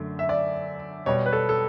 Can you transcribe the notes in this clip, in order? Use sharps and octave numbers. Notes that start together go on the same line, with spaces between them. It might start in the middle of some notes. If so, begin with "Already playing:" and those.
Already playing: F#2 D3 A3
E5
D5
B2 G3 C#5
B4
A4
A4